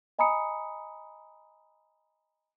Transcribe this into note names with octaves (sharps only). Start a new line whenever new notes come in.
D#5 G#5 A#5 B5 D#6 C#7